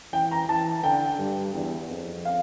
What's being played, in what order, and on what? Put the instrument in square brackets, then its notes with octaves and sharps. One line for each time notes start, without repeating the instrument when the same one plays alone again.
[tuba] E3 [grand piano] G5
[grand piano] A#5
[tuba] E3 [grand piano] A5
[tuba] D3 [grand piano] G5
[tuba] G2
E2
F2
[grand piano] F5